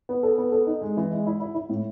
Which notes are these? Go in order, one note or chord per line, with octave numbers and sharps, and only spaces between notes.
B3
A4
B3
A4
D#4
G#3
E3
G#3
E4
E4
E4
A2